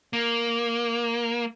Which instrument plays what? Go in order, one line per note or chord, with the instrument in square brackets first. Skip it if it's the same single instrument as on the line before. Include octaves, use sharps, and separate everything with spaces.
[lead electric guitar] A#3